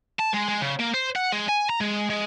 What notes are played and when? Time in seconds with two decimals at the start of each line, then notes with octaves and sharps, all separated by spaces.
0.20 A5
0.34 G#3
0.49 G#3
0.62 C#3
0.80 A#3
0.94 C5
1.16 F#5
1.32 G#3
1.49 G#5
1.69 A#5
1.81 G#3
2.10 G#3